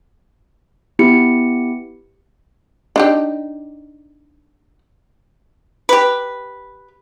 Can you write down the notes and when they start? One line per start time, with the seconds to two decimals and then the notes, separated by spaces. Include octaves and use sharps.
0.99 B3 E4 G4 C#7
2.96 D4 D#4 G4
5.89 G4 B4